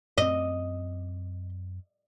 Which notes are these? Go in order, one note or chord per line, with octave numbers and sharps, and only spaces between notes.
F#2 C4 D#5